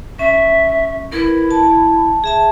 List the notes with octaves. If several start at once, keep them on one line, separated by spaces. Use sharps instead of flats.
C#4 E5
E4 A#4 B4
A5
G#4 E5 A5